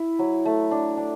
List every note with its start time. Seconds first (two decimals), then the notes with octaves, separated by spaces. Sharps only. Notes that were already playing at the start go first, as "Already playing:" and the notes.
Already playing: E4
0.19 F#3
0.46 A3
0.71 D4
0.97 D4